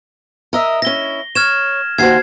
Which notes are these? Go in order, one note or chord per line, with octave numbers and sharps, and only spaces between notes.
A#4 D#5 E5
C#4 E4 A#6 G7
C#5 F6 G#6 E7
D#2 F#4 C5 G#6 C7